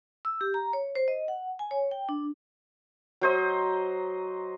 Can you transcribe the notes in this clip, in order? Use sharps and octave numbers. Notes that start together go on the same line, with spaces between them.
E6
G4
A#5
C#5
C5
D#5
F#5
G#5
C#5
G5
D4
F#3 C5 D#5